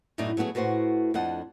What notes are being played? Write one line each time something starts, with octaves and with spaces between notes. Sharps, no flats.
F#2 A2 B3 D#4 D5 E5
F#3 A3 B3 F#4 G#4
A2 F#4 B4 C5 F#5
F2 D4 D#5 F#5